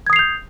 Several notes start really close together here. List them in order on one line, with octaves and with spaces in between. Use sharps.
G#6 D#6 C7 F7 G6